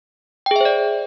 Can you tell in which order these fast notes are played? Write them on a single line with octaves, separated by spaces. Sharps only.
G5 G#4 E5 C5 D5